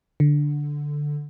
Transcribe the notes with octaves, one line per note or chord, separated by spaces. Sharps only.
D3